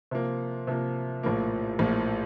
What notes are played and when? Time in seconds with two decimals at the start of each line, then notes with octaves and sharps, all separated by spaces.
0.11 C3 F3 A#3
0.67 C3 F3 A#3
1.23 A#1 A2 F3 A#3
1.79 A#1 A2 F3 A#3